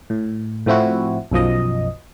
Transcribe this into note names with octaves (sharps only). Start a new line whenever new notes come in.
A2
A2 F3 C4 E4 F#4
B1 F#2 F3 D#5